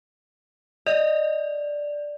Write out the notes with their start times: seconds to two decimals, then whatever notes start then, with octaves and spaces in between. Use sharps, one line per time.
0.86 D5 D#5